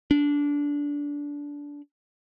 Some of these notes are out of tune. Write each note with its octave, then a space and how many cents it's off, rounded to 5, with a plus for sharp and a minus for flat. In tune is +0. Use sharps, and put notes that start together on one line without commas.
D4 -20